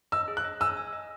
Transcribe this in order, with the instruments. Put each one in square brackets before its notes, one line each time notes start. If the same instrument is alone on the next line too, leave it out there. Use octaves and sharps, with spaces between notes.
[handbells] D#5 [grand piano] E6
[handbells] G#4
[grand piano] F#6
[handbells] D#5
[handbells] G#5 [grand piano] E6
[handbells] G#5
D#5